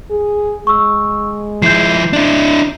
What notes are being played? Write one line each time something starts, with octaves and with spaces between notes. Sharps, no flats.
G#4
G#3 C#6 E6
F3 E4 G6 C7
D4 E4